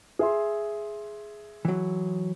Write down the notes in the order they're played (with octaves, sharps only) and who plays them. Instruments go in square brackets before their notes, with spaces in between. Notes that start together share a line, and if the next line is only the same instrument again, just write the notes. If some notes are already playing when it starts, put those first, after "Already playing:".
[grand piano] G#4 E5 C6
[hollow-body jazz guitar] E3 F#3